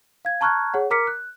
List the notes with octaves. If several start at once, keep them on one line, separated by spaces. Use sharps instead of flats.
F5 G#6
A5 A#5 C#6 F6 F#6 G#6
G#4 C#5 F#5
A#4 A#5 D6 F6 B6 C#7
F#6